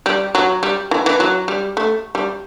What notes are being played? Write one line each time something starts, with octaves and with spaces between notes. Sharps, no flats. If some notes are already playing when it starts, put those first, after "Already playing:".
G3
F#3
G3
E3
E3
F#3
G3
A3
G3